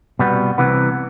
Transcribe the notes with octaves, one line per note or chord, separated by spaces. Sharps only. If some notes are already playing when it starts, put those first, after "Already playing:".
C2 B2 G3 B3
C2 C3 E3 B3